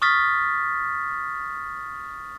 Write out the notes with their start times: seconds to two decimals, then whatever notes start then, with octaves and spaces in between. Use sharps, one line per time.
0.02 C#6 D#6 F6 A6 B6